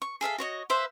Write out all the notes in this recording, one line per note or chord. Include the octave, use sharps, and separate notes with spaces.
C#6
G#4 A4 E5 F5
F#4 C#5 D#5
B4 C5 E5 F5